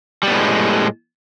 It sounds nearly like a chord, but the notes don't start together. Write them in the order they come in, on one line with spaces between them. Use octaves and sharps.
G3 B3 A2 G#3